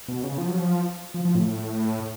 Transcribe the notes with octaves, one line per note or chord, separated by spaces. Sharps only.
B2
C#3
F3
F#3
F3
F3
F3
A2